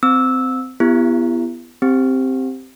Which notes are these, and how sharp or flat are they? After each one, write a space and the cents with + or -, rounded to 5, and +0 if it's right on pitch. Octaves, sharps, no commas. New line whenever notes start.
C4 -20 E6 -10
B3 +5 E4 +35 G4 +25
C4 +0 G4 +0